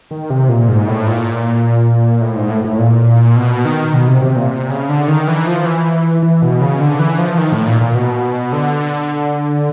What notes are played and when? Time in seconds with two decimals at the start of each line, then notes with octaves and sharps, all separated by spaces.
0.11 D#3
0.30 C3
0.49 A#2
0.68 G#2
0.88 A2
1.07 A#2
2.21 A2
2.36 G#2
2.50 A2
2.64 A2
2.79 A#2
3.36 B2
3.65 D#3
3.94 B2
4.08 C3
4.22 C3
4.36 A#2
4.51 C3
4.70 C#3
4.89 D3
5.08 D#3
5.27 E3
5.46 F3
5.65 E3
6.23 E3
6.42 B2
6.61 C#3
6.80 D3
6.99 E3
7.18 F3
7.38 D#3
7.52 A2
7.67 A#2
7.81 A#2
7.95 B2
8.52 D3